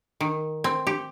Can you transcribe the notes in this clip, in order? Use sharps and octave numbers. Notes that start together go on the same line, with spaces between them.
D#3
C4
G4